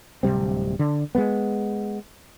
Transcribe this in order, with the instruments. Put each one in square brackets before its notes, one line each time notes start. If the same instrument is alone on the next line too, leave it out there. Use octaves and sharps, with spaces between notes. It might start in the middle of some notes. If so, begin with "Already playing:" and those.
[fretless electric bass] D1 C3 G3 C4
D3
G#3 A#3 B3